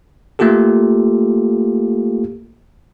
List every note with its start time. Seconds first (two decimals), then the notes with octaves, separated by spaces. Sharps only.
0.39 A3 A#3 F4 G4 A4